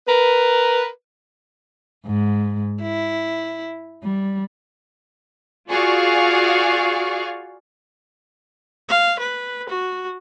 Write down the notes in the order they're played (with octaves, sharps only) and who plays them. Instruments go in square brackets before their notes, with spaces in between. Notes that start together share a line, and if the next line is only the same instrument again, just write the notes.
[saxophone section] A#4 B4
[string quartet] G#2
E4
G3
[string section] F4 F#4 G#4 D5 F5 C#6
[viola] F5
B4
F#4